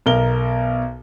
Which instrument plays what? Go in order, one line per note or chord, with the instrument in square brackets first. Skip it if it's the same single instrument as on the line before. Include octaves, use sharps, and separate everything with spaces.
[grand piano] B1 A#4 G7